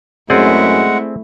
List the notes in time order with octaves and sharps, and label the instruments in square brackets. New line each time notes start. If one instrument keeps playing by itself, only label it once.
[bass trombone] F#2 [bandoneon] G#3 F#5 [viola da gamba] A3 E4 [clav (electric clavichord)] C4 G#4 D5